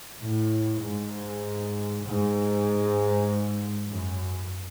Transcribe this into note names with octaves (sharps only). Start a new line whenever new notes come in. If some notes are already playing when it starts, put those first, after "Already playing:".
A2
G#2
G#2
F#2